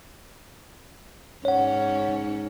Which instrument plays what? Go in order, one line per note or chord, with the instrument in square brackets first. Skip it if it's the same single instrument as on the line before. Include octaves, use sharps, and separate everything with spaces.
[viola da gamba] G#2 C#4 [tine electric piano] C#5 F#5